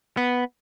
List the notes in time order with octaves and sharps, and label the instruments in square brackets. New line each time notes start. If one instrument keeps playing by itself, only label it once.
[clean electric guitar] B3